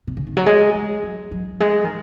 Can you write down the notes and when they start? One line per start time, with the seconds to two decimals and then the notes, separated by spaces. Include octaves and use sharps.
0.07 B2
0.17 C#3
0.27 D#3
0.37 F#3
0.46 G#3
0.74 G#3
1.03 F#3
1.31 F#3
1.60 G#3
1.84 D#3